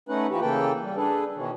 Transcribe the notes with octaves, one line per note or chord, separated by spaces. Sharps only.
A3 C#4 D#4 B4 F#5
E3 F3 F#4 G4 B4
C#3 E3 A#3 A4 B4 G5
G3
D4 G#4 A4 B4
B2 D#3 E3 C#4